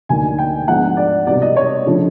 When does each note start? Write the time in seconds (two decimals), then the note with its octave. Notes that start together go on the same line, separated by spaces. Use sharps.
0.09 D2 D3 F#3 A#3 D#4 G#5
0.38 G5
0.68 G#2 F3 G#3 B3 D4 F#5
0.97 D5
1.27 C2 B2 G3 D5
1.42 D#5
1.56 C#5
1.86 C#3 F3 A3 D4